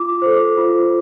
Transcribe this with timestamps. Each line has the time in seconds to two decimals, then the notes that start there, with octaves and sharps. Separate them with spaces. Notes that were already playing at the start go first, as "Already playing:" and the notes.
Already playing: F4 D6
0.22 A4 C5
0.57 F4